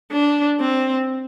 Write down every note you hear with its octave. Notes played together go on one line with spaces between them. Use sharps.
D4
C4